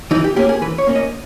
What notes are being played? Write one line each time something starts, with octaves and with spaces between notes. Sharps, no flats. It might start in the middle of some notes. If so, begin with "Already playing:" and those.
E3 D#4
G4
A#3 C#4 G4
G#4
E3 B4
C#5
A#3 C#4
D#5